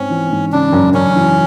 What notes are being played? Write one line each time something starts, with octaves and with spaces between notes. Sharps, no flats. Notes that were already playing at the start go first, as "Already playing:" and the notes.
Already playing: G#2 C4 C#4
E3
G#2
C#3 D4
F#2
F#2 C#4
E3